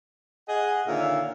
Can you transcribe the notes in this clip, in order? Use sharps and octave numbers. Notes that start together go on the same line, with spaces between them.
G#4 D#5 F#5
A#2 D3 D#3 C#5 E5 F5